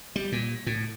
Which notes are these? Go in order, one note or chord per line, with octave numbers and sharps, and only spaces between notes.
G3
A#2
A2